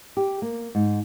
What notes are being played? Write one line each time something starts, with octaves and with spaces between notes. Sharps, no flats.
G4
A#3
G#2